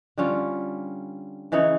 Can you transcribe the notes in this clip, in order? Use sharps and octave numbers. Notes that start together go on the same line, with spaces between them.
D3 G3 C#4 F4
C#3 E3 D#4 C#5